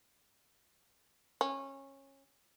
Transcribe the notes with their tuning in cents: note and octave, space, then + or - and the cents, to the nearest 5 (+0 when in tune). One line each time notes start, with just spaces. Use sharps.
C#4 -20